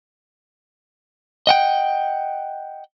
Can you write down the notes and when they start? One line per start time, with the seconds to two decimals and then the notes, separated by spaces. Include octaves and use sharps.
1.47 D#5 F#5 G5